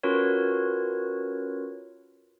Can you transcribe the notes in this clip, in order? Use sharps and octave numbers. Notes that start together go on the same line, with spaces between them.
C#4 F4 F#4 A#4 B4 C#5